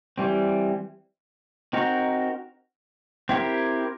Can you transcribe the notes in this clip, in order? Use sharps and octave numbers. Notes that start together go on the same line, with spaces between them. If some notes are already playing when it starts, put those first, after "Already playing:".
E3 G3 C4
C4 D#4 F#4 A#4
C4 E4 G4 A#4